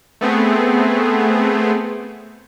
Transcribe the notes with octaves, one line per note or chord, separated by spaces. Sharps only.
A3 B3 C4 G#4